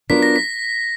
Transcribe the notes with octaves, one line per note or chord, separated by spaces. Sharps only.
F#3 B3 D4 F4 A#4 B6
A#6
B6